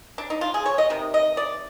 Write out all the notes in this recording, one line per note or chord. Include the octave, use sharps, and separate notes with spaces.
D4
D#4
F4
G#4
C#5
D#5
C3 D#3
D#5
D5